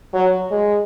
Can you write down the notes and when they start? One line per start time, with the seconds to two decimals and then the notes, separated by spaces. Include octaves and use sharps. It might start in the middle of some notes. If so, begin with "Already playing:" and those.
0.13 F#3
0.51 G#3